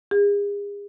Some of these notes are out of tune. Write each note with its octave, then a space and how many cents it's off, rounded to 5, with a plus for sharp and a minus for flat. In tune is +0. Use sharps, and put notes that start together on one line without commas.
G#4 -40